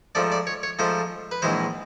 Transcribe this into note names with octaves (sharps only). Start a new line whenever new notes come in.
G#2 F3 A3 D5
D5
C#5
C#5
G#2 F3 A3 C5
B4
A#1 G#2 E3 G#3 C5